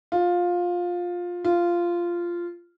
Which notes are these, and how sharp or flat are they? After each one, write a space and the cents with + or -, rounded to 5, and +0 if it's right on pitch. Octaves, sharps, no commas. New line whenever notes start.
F4 +15
F4 -10